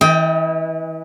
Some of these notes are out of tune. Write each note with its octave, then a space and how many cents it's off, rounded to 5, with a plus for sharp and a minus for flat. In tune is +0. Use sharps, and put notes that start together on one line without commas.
E3 -30 D#5 +30 G5 +0